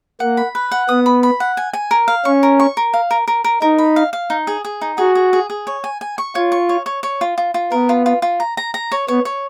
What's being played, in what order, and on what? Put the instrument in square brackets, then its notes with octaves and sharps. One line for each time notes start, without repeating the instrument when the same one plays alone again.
[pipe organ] A#3 [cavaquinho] F#5
[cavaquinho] B5
B4
F#5
[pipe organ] B3 [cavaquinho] D#6
[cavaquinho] B5
B5
F#5
G#5
G#5
A#4
F5
[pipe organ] C#4 [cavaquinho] C#6
[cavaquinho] A#4
C#6
A#4
F5
A#4
A#4
A#4
[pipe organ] D#4 [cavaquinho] A#4
[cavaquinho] B5
F5
F5
D#4
G#4
G#4
D#4
[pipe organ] F#4 [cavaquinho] G#4
[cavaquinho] G#4
G#4
G#4
C#5
G#5
G#5
C#6
[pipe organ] F4 [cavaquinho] C#5
[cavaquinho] C#6
C#5
C#5
C#5
F4
F4
F4
[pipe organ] B3 [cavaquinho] A#4
[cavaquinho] F4
F4
F4
A#5
A#5
A#5
C#5
[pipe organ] B3 [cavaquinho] C#5
[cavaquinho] C#5